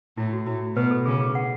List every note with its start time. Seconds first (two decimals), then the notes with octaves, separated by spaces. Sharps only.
0.17 A2 E4
0.33 F#4
0.46 A2 E4
0.76 B2 B4
0.91 A4
1.06 C#3 G#4
1.20 G#4
1.35 F#5